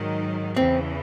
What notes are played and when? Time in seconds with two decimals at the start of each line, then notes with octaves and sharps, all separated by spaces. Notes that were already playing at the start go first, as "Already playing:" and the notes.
Already playing: G#2 D#3 F#3
0.56 E2 C#3 E3 C4